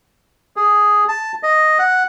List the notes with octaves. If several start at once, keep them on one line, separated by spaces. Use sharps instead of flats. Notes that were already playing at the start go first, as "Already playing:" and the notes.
G#4
A5
D#5
F#5